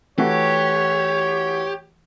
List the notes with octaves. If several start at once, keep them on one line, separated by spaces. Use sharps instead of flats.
E3 A3 F#4 G4 C#5